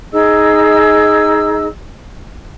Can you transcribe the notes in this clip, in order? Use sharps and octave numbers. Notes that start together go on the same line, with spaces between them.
D#4 G#4 D#5 E6